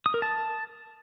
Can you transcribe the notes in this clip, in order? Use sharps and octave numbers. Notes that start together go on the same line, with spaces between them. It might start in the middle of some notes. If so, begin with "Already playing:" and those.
D#6
A#4
A5